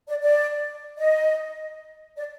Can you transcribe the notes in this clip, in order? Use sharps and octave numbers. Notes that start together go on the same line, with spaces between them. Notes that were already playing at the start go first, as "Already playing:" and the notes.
D5
D5
D#5
D5